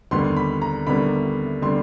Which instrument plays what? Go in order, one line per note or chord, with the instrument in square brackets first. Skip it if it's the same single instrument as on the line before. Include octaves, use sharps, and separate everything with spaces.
[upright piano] D#2 D3 G3 B3 C6
B5
A#5
D#2 D3 G3 B3 B5
D3 G3 B3 C6